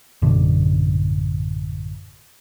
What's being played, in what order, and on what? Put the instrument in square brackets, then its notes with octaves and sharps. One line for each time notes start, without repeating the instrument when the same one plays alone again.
[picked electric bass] A1 F#2 B2 D3